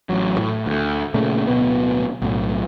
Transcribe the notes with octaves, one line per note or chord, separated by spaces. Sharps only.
A1 F#3
A2
D2
A#2 C#3 A3
D1 B2 B3
B1 A2